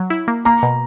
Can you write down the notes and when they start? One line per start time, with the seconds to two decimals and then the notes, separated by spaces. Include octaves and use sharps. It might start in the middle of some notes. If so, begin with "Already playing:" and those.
Already playing: F#3
0.10 E4
0.28 A#3
0.45 A#3 A#5
0.63 B2